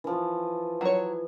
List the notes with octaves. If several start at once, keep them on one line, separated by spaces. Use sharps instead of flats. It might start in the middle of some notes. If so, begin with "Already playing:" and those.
E3 F3
F#3 C#5